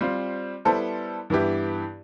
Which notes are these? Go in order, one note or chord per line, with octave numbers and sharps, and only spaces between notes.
G3 C4 F4 C5
G3 B3 E4 A4 C5
G2 E3 B3 E4 G4